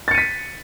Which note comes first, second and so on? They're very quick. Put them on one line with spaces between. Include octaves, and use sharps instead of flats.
A6 C#7 D#7 B6